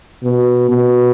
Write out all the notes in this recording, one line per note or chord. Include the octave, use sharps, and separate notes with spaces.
B2
B2